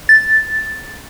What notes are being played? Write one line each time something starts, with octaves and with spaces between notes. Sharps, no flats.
A6